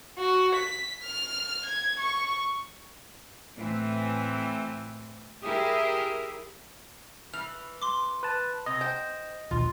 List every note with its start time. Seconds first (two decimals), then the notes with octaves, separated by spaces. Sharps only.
0.18 F#4
0.55 B6
1.03 F6
1.66 G#6
1.99 C#6
3.57 A2 E3 C4
5.44 E4 G4 G#4 A#4 E5
7.34 E3 F6 F7
7.82 C6 D6
8.23 B4 A5
8.66 C3 D#5
8.81 C5 G5
9.51 E1 A#1 D#2 F4